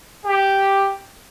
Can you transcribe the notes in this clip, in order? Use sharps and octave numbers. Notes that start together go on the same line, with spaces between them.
G4